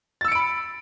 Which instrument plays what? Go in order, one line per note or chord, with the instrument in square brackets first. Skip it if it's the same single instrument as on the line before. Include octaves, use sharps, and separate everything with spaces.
[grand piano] A6
E6
C#7
D7
B5